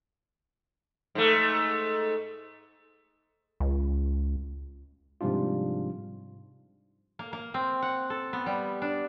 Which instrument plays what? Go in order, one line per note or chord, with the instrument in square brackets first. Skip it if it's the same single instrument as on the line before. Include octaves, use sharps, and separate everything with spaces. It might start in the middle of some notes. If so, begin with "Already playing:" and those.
[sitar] G#2 A3
[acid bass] C#2
[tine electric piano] G#2 C3 F3 G3 D4 F4
[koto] A#3
A#3
C4
F#5
A4
B3
G3
D4